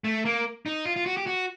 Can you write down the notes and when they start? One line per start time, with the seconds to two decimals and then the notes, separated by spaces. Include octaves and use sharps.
0.04 A3
0.25 A#3
0.66 D#4
0.85 F4
0.96 F4
1.06 F#4
1.17 G4
1.27 F#4